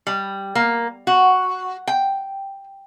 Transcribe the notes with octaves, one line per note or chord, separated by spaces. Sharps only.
G3
A#3
F#4
G5